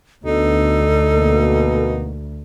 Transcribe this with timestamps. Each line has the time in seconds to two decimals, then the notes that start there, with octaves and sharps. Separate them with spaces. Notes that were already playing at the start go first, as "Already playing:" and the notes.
0.25 D2 B3 D4 D#4 F#4 A4
1.16 B2 A#3